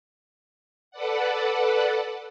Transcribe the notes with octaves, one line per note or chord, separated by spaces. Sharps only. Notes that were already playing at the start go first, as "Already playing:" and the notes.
A4 B4 D5 F#5